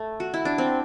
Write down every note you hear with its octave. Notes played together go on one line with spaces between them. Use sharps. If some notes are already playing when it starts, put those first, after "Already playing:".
Already playing: A3
F#4
E4
D4
C4